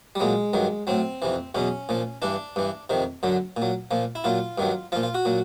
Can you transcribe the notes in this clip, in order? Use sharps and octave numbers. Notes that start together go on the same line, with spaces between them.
G3
A#2 F#3 G#3
G2 D#3 F#3
A2 F#3 C4
F2 C3 E3
E2 B2 F#3 C#4
A#2 F3
G2 E3 D4
G2 E3
F2 C3 D#3
F#2 D3 F#3
A#2
F#3
A#2 F3
E4
A#2 F#3 F4
G2 D#3 F#3
A#2 F3 F4
F4
F#4
A#2 F#3